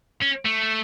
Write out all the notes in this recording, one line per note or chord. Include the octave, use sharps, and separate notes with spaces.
C#4
A3